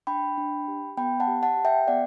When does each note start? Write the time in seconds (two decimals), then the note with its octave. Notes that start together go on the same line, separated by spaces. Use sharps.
0.07 D4 G5 B5
0.37 D4
0.68 G4
0.97 B3 G5 B5
1.20 F#5 A5
1.28 G4
1.43 F#5 A5
1.57 G4
1.65 E5 G5
1.87 B3 D5 F#5